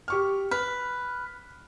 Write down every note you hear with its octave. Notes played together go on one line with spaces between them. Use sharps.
G4 C#6 F6
B4 F6